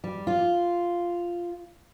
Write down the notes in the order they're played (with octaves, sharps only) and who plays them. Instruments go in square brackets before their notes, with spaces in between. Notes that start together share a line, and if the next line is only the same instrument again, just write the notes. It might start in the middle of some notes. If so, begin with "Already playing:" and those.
[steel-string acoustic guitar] G3
F4